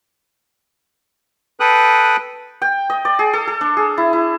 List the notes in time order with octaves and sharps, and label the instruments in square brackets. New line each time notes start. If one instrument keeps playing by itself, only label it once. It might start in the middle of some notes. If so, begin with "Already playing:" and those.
[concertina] A4 B4 G5 D#6 F#6
[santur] G5
D#5
D5
G#4
A4
A4
D4
G#4
E4
E4